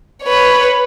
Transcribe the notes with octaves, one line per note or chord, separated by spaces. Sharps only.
B4 C#5